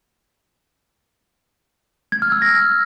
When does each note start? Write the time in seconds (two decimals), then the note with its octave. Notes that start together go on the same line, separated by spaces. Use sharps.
2.12 G#6
2.22 F6
2.32 E6
2.42 A#6